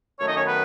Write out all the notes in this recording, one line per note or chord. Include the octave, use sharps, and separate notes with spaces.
F#2 D#3 A3 C#5
D#5
C#4 C#5
B3 B4